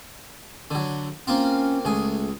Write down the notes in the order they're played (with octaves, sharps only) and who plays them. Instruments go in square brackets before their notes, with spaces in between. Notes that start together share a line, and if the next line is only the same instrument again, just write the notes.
[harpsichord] D3 F#3
[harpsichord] A#3 C4 F4 [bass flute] C#4
[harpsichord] C#2 G#4 [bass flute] A3